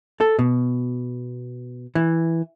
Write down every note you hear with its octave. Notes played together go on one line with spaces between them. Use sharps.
A4
B2
E3